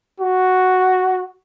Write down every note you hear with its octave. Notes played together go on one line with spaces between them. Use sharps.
F#4